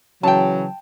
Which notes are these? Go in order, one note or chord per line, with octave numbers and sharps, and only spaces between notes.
C#3 E3 F#3 G5 A5